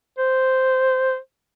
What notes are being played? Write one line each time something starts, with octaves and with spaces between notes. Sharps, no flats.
C5